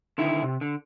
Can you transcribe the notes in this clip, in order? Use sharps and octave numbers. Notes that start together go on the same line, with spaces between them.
D3 D#3 E4
C3
D3